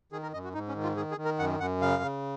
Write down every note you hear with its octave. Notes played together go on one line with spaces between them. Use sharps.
D#3 G#4
A#4
F#2 D#5
F#4
G#2 D#4
C#4
D#3
F4
D#3 G#4
G#4
D#3
A#4
F#2 F#5
F#2 F#5
C#3 F5
C#3